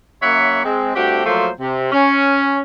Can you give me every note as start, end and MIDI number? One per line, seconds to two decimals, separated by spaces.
0.22 0.64 42
0.22 0.64 58
0.22 0.64 73
0.22 0.64 76
0.22 0.64 78
0.22 0.64 83
0.64 0.95 56
0.64 0.95 60
0.95 1.23 43
0.95 1.23 57
0.95 1.23 60
0.95 1.23 66
0.95 1.23 67
1.25 1.49 53
1.25 1.49 54
1.25 1.49 57
1.25 1.49 58
1.25 1.49 72
1.60 1.91 48
1.92 2.60 61